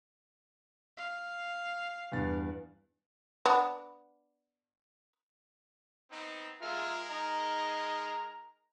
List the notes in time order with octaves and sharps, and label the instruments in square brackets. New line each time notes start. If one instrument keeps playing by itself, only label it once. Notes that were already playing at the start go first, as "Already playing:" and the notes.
[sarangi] F5
[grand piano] E2 G2 A6
[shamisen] B3 D4
[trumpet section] B3 C4 D#4
[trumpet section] G#3 G#4 A#4 [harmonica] F4 E5 F6
[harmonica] D#5 A#5